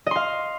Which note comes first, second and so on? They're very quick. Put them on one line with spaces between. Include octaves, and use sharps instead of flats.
D#5 C6 F5